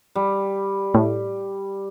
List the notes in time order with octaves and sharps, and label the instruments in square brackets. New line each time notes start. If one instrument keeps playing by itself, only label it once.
[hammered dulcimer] G3
[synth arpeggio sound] A2